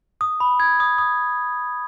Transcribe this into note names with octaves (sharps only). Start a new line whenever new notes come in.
D#6
B5
G#6
D#6
D#6